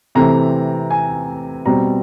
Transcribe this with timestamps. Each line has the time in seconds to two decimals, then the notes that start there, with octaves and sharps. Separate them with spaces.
0.15 C3 E3 A3 C4 A#5
0.91 G#5
1.65 B2 G3 C4 A#5